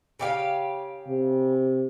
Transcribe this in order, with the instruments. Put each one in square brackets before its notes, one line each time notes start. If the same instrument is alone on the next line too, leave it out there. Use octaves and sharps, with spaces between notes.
[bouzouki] C#3 G4 F5
[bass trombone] C3